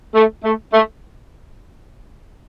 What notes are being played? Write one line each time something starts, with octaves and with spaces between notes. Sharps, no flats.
A3
A3
A3